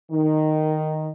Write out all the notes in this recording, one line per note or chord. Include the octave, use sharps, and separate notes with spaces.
D#3